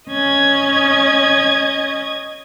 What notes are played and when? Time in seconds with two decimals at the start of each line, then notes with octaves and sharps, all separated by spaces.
0.11 C#4 D#5 G#6